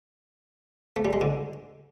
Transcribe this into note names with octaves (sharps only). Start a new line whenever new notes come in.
A3
G3
G#3
D3